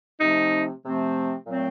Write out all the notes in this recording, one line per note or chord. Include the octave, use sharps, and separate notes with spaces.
C3 F3 A3 C4 D#4
C3 F3 A3 C4
A#2 F#3 A3 C4